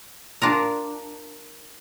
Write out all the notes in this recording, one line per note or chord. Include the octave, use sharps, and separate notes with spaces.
D4 F4 A#4